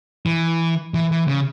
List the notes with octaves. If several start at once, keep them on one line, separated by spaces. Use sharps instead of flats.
E3
E3
E3
C#3